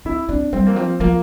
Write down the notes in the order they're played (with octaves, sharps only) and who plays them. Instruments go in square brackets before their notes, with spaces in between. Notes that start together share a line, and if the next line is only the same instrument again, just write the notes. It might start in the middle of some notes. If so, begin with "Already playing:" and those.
[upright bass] C4 [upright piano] E4
[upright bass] C4 [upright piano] D4
[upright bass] G3 [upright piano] C4
[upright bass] E3 [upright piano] A#3
[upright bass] F3 [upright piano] C4
[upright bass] F3 [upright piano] A#3